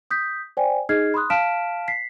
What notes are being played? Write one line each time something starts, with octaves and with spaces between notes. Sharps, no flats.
D#6 G6 B6
C5 D5 G5 G#5
D#4 G#4 D#5 F6 G#6 C7
B5 C6 D#6 F#6
F5 A5 F6 B6 D7 E7
B6 C7